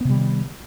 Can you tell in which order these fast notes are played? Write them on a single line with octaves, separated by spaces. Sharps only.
B3 C3 G3 D#3